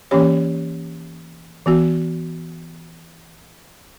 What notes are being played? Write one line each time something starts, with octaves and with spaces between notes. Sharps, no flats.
E3 A#3 C#4 G4 C#5
E3 B3 F#4